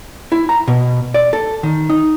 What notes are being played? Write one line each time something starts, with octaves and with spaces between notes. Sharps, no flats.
E4
A#5
B2
D5
A4
D#3
D#4